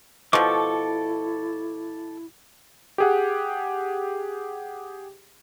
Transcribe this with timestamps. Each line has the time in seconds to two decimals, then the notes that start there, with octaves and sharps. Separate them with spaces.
0.33 B2 F3 E4 A4 C#6 D6
2.98 G4 G#4 F#5